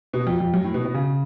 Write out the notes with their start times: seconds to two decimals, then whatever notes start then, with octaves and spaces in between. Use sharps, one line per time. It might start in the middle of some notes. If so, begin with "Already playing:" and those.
0.13 B2
0.27 F2
0.40 F2
0.54 F#2
0.64 A2
0.74 B2
0.85 B2
0.94 C#3